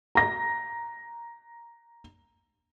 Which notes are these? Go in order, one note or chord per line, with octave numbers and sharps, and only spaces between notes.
A#5 A#6